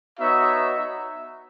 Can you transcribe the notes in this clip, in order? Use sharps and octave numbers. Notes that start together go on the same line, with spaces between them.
B3 D#4 F#4 C#5 E5